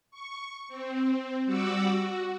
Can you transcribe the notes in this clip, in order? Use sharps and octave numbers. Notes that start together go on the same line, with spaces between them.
C#6
C4
G3 F#4 F#5 D6 E6
F#4